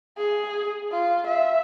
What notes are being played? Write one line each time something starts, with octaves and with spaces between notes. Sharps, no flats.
G#4
F4
E5